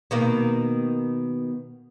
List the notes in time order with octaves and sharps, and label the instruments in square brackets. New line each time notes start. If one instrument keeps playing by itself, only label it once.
[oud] B2 D#3 A#3